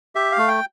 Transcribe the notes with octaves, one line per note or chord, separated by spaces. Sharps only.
G4 E5
F5
A3
G5